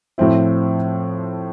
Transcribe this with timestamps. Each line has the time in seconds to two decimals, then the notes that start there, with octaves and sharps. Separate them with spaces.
0.18 A2 F3 C4 E4